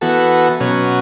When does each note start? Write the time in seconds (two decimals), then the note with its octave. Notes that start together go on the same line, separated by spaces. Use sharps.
0.01 E3 B3 F#4 A4
0.60 B2 F#3 C#4